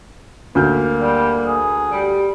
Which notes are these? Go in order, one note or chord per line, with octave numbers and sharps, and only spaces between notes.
D2 A#3 F6 G6
G3
G#4
G3